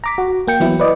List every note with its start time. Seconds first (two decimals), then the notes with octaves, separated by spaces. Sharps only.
0.04 A#5 D6 B6
0.18 F#4
0.48 A#3 G5 C#7
0.60 E3 F#3 B3 E4
0.80 B4 D5 D#5